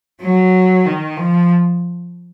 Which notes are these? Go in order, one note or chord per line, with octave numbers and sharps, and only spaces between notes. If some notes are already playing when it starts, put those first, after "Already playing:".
F#3
D#3
F3